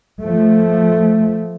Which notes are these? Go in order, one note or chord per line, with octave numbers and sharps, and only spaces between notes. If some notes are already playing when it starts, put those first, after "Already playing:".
F3 A3